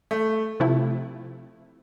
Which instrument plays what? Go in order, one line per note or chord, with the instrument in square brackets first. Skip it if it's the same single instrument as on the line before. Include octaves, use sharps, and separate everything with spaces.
[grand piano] A3
[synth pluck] C3 F3 A3 E4